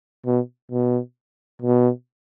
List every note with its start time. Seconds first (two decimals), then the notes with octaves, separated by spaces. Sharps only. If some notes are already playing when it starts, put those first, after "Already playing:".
0.25 B2
0.71 B2
1.62 B2